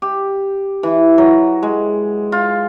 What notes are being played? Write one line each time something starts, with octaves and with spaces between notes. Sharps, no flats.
G4
E3
F#3
G#3
F4